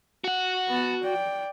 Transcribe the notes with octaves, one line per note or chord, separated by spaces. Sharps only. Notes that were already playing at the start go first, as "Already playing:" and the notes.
F#4 F#5
B3 A5
D5 G5